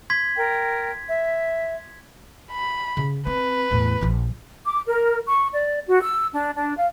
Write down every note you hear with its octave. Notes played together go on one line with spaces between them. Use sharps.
C6 G#6 B6
A#4 G5
E5
B5
C#3
C4 B4
E2 A2
A#1 F3
D6
A#4
C#6
D5
F#4
E6
D4
D4
F5